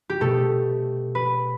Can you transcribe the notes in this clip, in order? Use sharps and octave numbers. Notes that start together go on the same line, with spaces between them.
G4
B2 A3 A4
B4